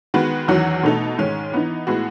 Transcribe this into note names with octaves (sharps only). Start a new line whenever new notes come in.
D#3 G#3 B3 F#4 B4
E2 D#3 F#3 C#4 F#4
B2 A3 D#4 A4
G#2 D#3 G#3 C#4
E3 B3 D#4
A2 G#3 B3 F#4